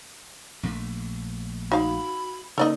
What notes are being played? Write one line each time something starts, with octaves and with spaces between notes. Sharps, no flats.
A#1 A#2 A3
D#4 F#4 F5 B5
C#3 A#3 D#4 A4 D5 D#5